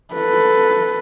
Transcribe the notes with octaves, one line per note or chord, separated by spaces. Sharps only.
A4 B4